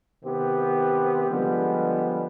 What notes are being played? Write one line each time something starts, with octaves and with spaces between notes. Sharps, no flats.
C3 D#3 B3 C4 G4
D3 F3 G3 G#3 B3